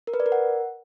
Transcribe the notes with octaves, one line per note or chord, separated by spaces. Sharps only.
A#4
B4
D5
A#4
F#5